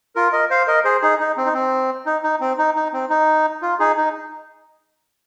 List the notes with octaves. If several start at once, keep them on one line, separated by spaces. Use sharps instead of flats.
F4 A#4
A#4 D#5
C5 F5
A#4 D#5
G#4 C5
D#4 G#4
D#4
C4
D#4
C4
D#4
D#4
C4
D#4
D#4
C4
D#4
F4
D#4 G#4
D#4